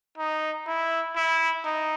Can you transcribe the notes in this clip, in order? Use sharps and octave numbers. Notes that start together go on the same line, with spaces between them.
D#4
E4
E4
D#4